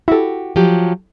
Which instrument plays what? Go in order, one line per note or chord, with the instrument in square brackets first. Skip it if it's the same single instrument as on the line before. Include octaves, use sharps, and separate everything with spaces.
[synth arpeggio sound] E4 A4 [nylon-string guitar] F#4 G4
[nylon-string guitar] F3 F#3 G4